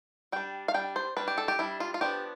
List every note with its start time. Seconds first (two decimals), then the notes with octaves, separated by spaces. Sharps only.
0.32 G3 D4 G5
0.68 F5
0.74 G3 D4 G5
0.96 C5
1.17 G3 D4 B4
1.28 G4
1.38 A4
1.48 G4
1.59 G3 D4 E4
1.80 F4
1.94 F4
2.01 F3 B3 D4 G4